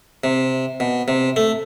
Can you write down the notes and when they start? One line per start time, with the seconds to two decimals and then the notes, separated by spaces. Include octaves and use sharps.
0.24 C3
0.80 B2
1.08 C3
1.36 A3